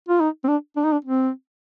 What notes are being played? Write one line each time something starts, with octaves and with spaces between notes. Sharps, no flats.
F4
D#4
C4
D4
D4
D#4
D4
C4